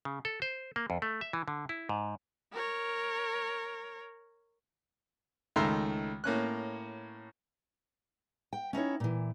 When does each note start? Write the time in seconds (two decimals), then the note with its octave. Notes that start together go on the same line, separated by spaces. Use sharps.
0.05 C#3
0.25 A4
0.42 C5
0.76 A#3
0.90 F2
1.02 A3
1.21 E5
1.33 E3
1.48 D3
1.69 E4
1.89 G#2
2.53 A#4 C#5
5.56 C#2 D#3 A3 E5 A#5 C6
6.24 A2 A#3 C#4 F#6
8.53 G5
8.73 C#4 D#4 E4 C#5
9.00 A#2 E3